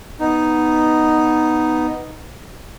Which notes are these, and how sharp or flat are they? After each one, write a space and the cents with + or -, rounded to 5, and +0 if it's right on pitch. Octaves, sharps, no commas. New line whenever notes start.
B3 +0 D#4 +0